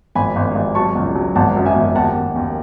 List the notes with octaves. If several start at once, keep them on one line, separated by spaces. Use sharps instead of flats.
G#1 G#5 B5
G#1
G#1
F#3 A5 C#6
C#2
F#3
G#1 F#5 A5
F#2
E5 G#5
G#1
D#2 F#5 A5
D#2
D#2